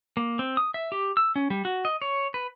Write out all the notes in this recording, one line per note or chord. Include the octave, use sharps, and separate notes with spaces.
A#3
C4
D#6
E5
G4
E6
C#4
G3
F#4
D#5
C#5
B4